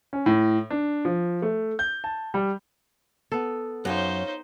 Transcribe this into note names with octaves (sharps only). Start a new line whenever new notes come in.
C#4
A2
D4
F3
A3
G6
A5
G3
B3 A4
F#2 D#4 F4 C5 C#5 F5